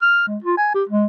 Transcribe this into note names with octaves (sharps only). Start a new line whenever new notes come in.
F6
G#3
F4
G#5
G4
G#3